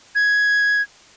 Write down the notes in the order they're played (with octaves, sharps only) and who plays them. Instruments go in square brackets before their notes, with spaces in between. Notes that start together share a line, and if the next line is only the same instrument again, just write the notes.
[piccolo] G#6